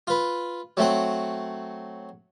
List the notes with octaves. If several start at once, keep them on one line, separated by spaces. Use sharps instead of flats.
F4 B4
F#3 A3 C4 F#5